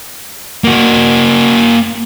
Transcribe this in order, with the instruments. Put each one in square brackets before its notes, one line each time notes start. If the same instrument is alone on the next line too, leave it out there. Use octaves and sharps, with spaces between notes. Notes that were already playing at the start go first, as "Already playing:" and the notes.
[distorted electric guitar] A#3 F#4